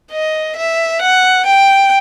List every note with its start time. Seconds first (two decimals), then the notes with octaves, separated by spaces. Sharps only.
0.12 D#5
0.57 E5
1.01 F#5
1.46 G5